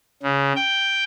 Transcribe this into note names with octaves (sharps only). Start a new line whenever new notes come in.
C#3
G5